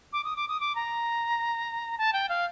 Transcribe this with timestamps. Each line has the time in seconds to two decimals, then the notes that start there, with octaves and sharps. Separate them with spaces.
0.13 D6
0.24 D#6
0.36 D6
0.48 D#6
0.60 D6
0.75 A#5
1.98 A5
2.13 G5
2.29 F5